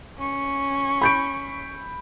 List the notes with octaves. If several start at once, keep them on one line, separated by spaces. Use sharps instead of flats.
C#4 C#6
B5 G6 D7